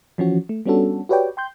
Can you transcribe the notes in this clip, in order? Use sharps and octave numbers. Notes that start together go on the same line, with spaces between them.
E3 F3 C#4 F#4
A3
G3 B3 C#4 D4 F#4 A4
F#4 G4 B4 C#5 D5 G5
G5 C6 G6